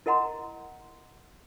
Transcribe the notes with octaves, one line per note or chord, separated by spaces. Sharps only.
E4 A#4 D#5 F#5 A#5 C6